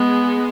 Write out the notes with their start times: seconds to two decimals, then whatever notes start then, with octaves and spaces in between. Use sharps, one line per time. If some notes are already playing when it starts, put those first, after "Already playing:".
Already playing: G#3 B3